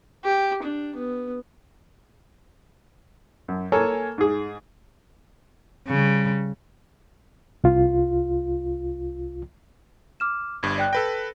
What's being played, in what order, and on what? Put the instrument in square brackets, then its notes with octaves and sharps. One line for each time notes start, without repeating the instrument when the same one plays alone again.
[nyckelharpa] G4
D4
B3
[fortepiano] F#2
A#3 A4 C#5 G#5
G#2 G#4
[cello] C#3 G3
[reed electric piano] C2 F4
[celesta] D6 F6 E7
[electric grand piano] G1 G2 [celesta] G#6
[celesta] D5 G5 F#6
[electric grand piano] A4 B4 G5 [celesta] A#6